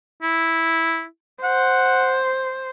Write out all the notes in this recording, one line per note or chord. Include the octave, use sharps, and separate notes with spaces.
E4
C5 F#5